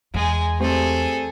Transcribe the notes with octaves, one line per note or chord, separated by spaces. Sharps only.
E2 G#3 G#4
G3 A3 C4 G#4 A4